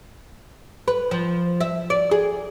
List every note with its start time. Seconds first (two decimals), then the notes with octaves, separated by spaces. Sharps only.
0.88 B4
1.11 F3
1.60 E5
1.90 D5
2.11 G#4